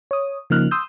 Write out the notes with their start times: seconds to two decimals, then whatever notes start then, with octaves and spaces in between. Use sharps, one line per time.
0.11 C#5 D#6
0.50 C#3 F3 A#3 D#4 F6 F#6
0.71 C6 D#6 E6 G6